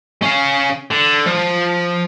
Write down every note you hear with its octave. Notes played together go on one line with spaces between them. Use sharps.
C#4 F5
D3
F3